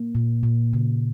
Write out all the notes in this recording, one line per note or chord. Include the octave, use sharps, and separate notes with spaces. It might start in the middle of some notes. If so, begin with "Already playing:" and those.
Already playing: A#3
A#2
A#2
C#3